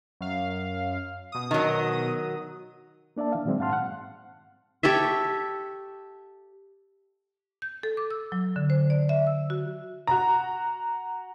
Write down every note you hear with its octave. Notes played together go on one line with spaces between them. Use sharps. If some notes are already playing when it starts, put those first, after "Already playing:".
F#2 F5
B2 D#6
D#3 F#3
A#3 D4 D5 E5 A5
E3 F5
A#2 D#3 F#3 G#3 C4 E5
G#2 F5 F#5 A5 C6 F6
F#5
G4 A4 C#5 E5
G6
A4
D6
E6
F#3
D3
C5
D5
E5
E6
F#4
F#4 A#5